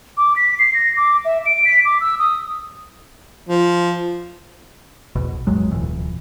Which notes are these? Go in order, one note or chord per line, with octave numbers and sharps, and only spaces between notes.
D6
B6
C7
A#6
D6
E5
D7
B6
D6
E6
D#6
F3
A#1 E2 B2
A1 E2 F#3 G#3
D1 F2 B2 E3